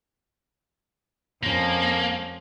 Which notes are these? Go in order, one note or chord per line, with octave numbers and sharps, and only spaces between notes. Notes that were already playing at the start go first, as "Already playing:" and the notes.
F2 F3 A#3 C#4